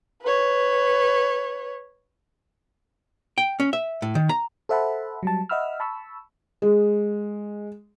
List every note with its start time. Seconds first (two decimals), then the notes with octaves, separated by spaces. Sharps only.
0.22 B4 C#5
3.38 G5
3.60 C#4
3.73 E5
4.02 A2
4.15 D#3
4.29 A#5
4.69 A4 C5 E5 F#5 A5 B5
5.23 F#3 G3 A5
5.49 D#5 E5 F#5 B5 E6 F6
5.80 A5 B5 C#6 E6
6.62 G#3